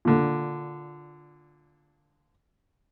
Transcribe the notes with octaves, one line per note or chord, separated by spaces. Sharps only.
A#2 D3